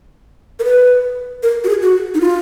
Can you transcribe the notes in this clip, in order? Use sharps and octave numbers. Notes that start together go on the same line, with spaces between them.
A#4
B4
A#4
F#4
G#4
F#4
D#4
F4